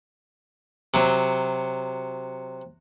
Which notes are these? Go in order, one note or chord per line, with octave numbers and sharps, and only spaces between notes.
C3 F#3